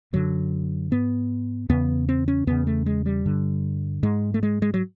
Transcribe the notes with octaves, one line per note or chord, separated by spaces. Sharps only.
F#2 D3 F#3
G#2 B3
E2 C#3 B3
C4
C#4
E2 C#3 B3
A3
G#3
G3
G2 D3
G#2 G#3
A3
G#3
G#3
F#3